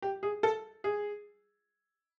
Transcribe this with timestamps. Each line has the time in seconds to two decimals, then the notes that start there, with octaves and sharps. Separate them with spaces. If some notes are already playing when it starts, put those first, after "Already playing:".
0.02 G4
0.23 G#4
0.43 A4
0.84 G#4